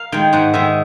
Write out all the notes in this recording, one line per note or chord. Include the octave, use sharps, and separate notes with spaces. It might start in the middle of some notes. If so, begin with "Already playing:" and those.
Already playing: A#4 F5
D#3 G#3 G5
G#2 F#5
D#3 G#3 E5